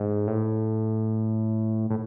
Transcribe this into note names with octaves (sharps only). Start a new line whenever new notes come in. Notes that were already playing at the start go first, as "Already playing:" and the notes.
Already playing: G#2
A2
A2